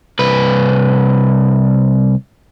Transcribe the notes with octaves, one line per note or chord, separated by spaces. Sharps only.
C2 B4